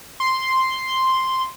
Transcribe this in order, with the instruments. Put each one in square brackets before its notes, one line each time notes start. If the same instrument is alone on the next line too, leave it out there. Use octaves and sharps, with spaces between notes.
[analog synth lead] C6